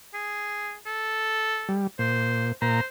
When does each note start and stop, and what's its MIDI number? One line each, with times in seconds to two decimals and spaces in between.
0.14 0.74 68
0.86 1.76 69
1.69 1.87 55
1.99 2.52 46
1.99 2.51 72
2.62 2.81 46
2.62 2.86 72
2.62 2.81 82